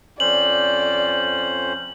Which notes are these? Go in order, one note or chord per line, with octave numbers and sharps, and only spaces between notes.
F2 C#4 C5 D5 F#7